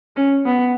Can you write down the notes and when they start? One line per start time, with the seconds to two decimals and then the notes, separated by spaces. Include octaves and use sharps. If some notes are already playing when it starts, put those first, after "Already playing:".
0.16 C#4
0.45 B3